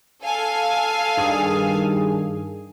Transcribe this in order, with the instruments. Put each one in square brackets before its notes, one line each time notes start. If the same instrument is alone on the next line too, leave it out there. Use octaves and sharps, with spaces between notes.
[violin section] A4 F5 G#5
[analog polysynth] G2 D#3 G#4